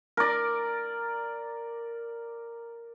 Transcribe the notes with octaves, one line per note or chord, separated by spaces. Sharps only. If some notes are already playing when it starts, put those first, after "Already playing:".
A#4 D5